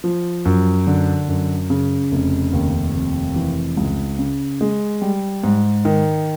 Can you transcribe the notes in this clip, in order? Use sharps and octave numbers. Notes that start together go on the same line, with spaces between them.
F3
F#2
D3
F#2
C#3
F1
D#2
F1
E3
C#2
C#3
G#3
G3
G#2
D#3